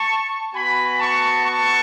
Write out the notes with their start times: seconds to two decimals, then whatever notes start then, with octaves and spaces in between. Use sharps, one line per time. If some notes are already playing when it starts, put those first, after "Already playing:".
Already playing: A5 C#6
0.54 B3 F#4 G#5 B5
0.99 A5 C#6
1.45 A5 C#6